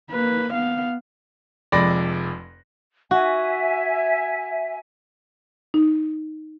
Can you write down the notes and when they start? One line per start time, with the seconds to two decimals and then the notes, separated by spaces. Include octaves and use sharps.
0.11 A#3 B4
0.54 B3 F5
1.72 F1 F2 G#3 D5 B5 A#6
3.11 F#4 E5 G#5
5.74 D#4